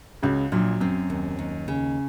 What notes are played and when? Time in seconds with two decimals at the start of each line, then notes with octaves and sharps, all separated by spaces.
0.22 C#2 C#3 F#4
0.52 A#1 A#2 F#3
0.81 F#2 C4
1.10 D#2
1.39 D#2
1.68 C#3